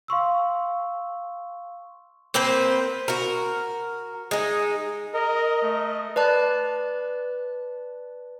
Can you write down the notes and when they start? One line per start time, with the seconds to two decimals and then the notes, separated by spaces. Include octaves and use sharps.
0.08 F5 C6 C#6 E6
2.34 A#3 C4 B4 C5
3.08 F#4 A#4
4.31 G#3 D#4
5.14 A#4 D#5
5.62 A3
6.16 B4 D5 A5 F#6